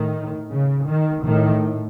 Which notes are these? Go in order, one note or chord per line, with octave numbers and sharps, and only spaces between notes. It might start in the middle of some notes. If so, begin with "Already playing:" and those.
Already playing: A2 D#3
C#3
D#3
A2 D#3